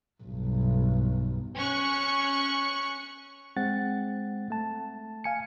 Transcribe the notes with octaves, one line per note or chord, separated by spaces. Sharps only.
B1 G2
C#4 C#6 F#6
G#3 C4 F#5 A6
A3 A5
F5 G#5 C#7